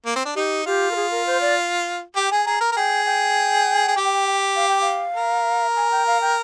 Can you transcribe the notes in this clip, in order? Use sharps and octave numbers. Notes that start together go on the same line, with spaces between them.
A#3
C4
D4
D#4 G4
F4 G4
A#4
G#4
A#4
C5
D5
G4 G5
G#4 G#5
G#4 A#5
A#4
A#4
G#4 G5
G5
G#4
G4
F5
G5
F5
A#4
G#5
G5
F5
G5